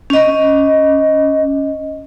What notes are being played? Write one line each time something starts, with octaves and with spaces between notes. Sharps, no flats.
C#4 D#5